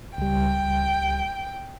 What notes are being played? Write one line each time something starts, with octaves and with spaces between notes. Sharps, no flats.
C#2 G3 G5